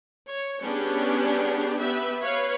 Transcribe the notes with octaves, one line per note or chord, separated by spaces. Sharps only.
C#5
G3 B3 C#4 D4 G4 G#4
B3 G4 B4 E5
B4 C#5 F5